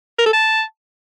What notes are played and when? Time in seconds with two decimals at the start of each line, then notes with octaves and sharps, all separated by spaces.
0.19 A#4
0.26 A4
0.33 A5